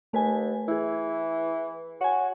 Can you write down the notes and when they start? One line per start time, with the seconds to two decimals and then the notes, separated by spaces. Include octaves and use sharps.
0.13 D#2 A3 B4 G#5
0.68 E3 E4 G#4
2.01 F#4 C#5 G#5